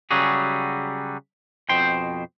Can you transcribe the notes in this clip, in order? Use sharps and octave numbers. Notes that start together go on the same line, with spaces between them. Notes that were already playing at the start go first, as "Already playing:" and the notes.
C#3 F#3 G3 F#4 G#4
F2 B2 C5 G5 C6